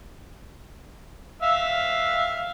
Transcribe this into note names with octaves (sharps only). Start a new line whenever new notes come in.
E5 F5